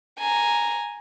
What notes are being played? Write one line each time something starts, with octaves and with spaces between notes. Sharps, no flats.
G#5 A#5